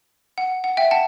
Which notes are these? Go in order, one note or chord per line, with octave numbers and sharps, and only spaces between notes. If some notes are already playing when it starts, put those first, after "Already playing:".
F#5
F#5
E5 G5
F#5 A5